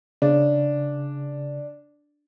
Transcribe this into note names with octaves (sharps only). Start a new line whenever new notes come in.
C#3 D4